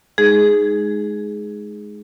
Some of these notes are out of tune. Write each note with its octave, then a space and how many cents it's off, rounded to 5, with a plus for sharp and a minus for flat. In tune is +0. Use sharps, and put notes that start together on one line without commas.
G#3 +20 D#4 +0 G#4 +0